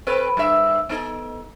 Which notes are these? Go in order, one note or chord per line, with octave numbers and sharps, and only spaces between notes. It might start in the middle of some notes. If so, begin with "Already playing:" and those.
C4 A4 B4
G2 E5
B3 D#4 A4